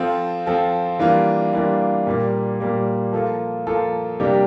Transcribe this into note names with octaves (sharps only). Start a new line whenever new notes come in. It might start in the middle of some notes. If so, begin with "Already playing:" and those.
Already playing: F3 C4 F4 A4
F3 C4 F4 A4
E3 G3 A#3 D4 F4
E3 G3 A#3 D4 F4
A#2 G3 A#3
A#2 G3 A#3
F3 A#3 F4 A4
F3 A#3 F4 A4
C3 G3 A#3 D4 G4